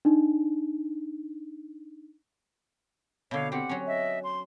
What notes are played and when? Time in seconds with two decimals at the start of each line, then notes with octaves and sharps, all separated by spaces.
0.05 D4 D#4
3.31 B2 D3 C#5 F5
3.52 C4 G4 F#5
3.69 F#3 C#4
3.87 D#5 E5
4.23 C6